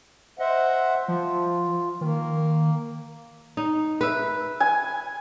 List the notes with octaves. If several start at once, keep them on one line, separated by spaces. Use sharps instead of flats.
C5 D#5 E5 F#5
F3 F4
D#3 A#3
D#4
B4 E5
G#5